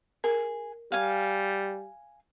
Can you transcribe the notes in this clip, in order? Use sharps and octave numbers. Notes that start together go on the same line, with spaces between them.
G#4 A#4
G3 F5 G#5